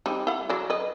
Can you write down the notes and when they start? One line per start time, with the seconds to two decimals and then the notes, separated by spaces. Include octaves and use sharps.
0.06 G3 C4 D#4
0.27 E4 F#5
0.49 F#3 D5
0.70 B4 D#5